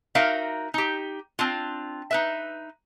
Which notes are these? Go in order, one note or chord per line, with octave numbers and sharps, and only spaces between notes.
D#4 F#4 A#4 E5 F5
D#4 G4
C4 D4 F4
D#4 B4 E5